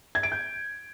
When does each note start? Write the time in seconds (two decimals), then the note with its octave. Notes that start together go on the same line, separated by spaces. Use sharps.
0.15 G#6
0.23 D7
0.32 G6